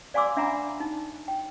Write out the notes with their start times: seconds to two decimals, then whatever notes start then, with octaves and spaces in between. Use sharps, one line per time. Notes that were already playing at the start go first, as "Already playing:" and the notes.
0.14 D5 F5 G#5 C6 D6 E6
0.37 D4 E5 F#5 G#5 A#5 B5
0.80 D#4
1.28 G5